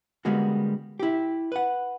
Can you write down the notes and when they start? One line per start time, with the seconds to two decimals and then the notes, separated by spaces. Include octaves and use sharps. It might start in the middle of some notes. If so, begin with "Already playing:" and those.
0.25 D3 G3 G#3 A#3 B3 F#4
0.99 E4 G4
1.52 B4 F#5